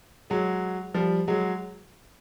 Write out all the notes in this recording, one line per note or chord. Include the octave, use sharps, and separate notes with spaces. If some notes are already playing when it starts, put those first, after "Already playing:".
F#3 G#3
F3 G3
F#3 G#3